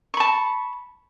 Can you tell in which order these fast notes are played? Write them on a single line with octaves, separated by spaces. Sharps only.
C#6 B5 A5